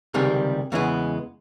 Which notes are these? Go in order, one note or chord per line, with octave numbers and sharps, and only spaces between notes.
C#2 C3 D#3 G3 G#4
E2 C#3 E3 G#3 B3